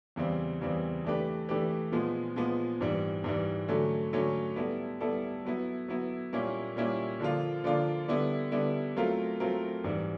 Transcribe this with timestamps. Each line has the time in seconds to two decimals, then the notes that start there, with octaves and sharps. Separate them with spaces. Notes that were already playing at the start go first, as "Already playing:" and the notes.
0.16 E2 C#3 E3 G3 C4
0.61 E2 C#3 E3 G3 C4
1.04 E3 A3 D4 G4 B4
1.49 E3 A3 D4 G4 B4
1.92 A#2 F3 G#3 B3
2.36 A#2 F3 G#3 B3
2.81 G#2 E3 G3
3.24 G#2 E3 G3
3.68 D3 F#3 A3 C#4
4.13 D3 F#3 A3 C#4
4.56 G3 B3 E4 A4
5.00 G3 B3 E4 A4
5.45 F#3 B3 E4
5.88 F#3 B3 E4
6.33 A#2 G3 A#3 C#4 E4
6.76 A#2 G3 A#3 C#4 E4
7.20 D3 F3 A#3 D4 F4
7.64 D3 F3 A#3 D4 F4
8.08 D3 G3 B3 E4
8.52 D3 G3 B3 E4
8.96 F#3 A3 C4 F4 A#4
9.40 F#3 A3 C4 F4 A#4
9.84 G#2 E3 G3